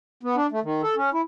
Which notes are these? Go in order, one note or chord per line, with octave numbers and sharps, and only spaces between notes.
B3
D4
A3
D#3
A4
C#4
E4